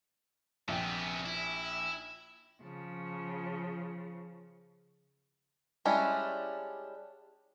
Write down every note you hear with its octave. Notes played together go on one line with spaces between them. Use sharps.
A#1 C3 B3 G5
E4
C#3 F3
G3 G#3 C#4 D4 E4